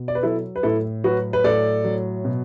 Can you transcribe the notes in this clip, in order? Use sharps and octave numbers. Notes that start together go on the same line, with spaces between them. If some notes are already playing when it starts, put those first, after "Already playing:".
Already playing: B2
D5
B4
F#3 E4 A4
B4
A2 E4 A4
F#3 F#4 B4
B4
A2 A4 D5
F#3
B2